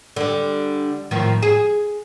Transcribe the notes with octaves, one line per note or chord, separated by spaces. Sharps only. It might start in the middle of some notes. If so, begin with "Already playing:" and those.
D3 G3
A2 D#3 F3
G#4